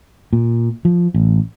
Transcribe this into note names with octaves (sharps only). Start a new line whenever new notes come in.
A#2
F3
A1